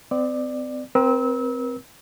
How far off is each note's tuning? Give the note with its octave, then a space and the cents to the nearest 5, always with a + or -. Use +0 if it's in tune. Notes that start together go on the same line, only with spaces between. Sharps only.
C4 -35 D5 +15
C4 -5 A#4 +45 E6 -30